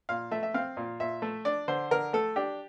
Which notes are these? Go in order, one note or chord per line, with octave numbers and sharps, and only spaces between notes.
A#2 F5
A3 E5
E5
C4 F5
A#2
A#2 E5
A3
D4 D5
D3 C5
D3 A#4
A3 A4
D4 G4